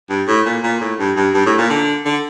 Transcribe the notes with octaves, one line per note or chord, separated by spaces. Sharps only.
G2
A2
A#2
A#2
A2
G2
G2
G2
A2
A#2
D3
D3